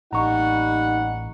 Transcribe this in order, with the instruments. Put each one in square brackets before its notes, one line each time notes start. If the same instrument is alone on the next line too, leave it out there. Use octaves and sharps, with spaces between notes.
[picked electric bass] A1 [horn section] G3 A#3 F#5 [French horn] D#4 [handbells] A#5 C#6